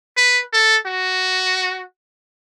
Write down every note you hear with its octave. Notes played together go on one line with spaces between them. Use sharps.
B4
A4
F#4